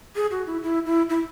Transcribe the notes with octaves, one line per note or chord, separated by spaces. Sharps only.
G#4
F#4
E4
E4
E4
E4